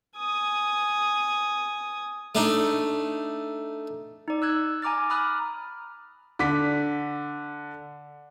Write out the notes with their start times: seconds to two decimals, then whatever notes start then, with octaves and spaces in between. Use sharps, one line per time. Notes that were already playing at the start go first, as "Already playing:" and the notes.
0.17 G#5 D#6
2.35 A3 D4 D#4
4.28 D#4 D5
4.42 E6 F#6 G#6
4.82 G#5 A#5 D6 F6 A6
5.10 A#5 B5 D6 D#6 F6 F#6
6.39 D3 D6 B6